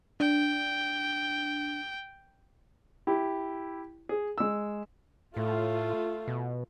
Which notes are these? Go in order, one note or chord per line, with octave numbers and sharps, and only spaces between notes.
D4 G5
E4 G4
G#4
G#3 E6
A2 A3 F4
B2